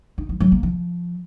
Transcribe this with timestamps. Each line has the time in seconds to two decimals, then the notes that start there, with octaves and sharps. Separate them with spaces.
0.18 D#4
0.29 F3
0.40 F#3
0.52 A#3
0.63 F3